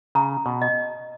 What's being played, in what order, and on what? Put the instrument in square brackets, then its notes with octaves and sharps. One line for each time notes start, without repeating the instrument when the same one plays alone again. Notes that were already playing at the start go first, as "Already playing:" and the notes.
[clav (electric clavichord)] C#3 [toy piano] A#5
[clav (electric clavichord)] B2
[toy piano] D#5